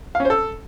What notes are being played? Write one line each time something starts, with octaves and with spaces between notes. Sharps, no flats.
F5
C#4
C5
A4